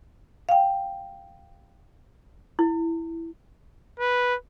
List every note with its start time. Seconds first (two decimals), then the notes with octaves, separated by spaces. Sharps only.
0.49 F5 G5
2.59 E4
4.00 B4